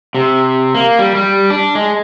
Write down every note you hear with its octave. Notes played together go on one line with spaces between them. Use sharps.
C3
A#3
G3
G3
D4
G#3